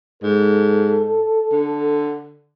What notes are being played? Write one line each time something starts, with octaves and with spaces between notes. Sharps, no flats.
G#2 A4
D3